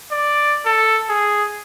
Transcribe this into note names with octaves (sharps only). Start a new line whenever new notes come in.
D5
A4
G#4